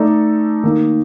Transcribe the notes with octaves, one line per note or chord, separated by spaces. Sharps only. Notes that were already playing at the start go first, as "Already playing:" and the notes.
Already playing: A3 D#4 A4 D5
D#3 A#3 D#4